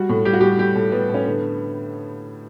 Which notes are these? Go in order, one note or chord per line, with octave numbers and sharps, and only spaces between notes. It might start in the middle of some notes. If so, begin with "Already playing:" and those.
Already playing: G3 F#4
A2
G3 G4
F#4
G3 G4
G3 G4
A2
G3 B3
A2
C#4
D3 B3